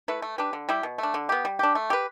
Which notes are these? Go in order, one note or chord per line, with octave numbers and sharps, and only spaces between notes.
A3 E4 B4
A3
D4 G4 B4
D3
G3 E4 G4
B2
A3 D4
D3
B3 G4
G3
D4 G4
A3
G4 B4